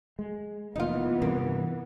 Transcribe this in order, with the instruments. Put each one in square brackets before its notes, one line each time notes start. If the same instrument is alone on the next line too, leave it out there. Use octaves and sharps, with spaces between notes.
[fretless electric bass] G#3
[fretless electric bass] F1 B2 A#3 [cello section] E3 B3 [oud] D#4 F4
[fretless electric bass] G2 C3 [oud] A#3